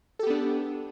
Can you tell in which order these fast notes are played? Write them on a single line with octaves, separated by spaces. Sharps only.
A4 G4 B3 D4